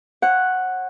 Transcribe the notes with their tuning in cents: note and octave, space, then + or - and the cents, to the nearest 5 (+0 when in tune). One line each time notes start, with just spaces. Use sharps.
C#5 -35 F#5 +0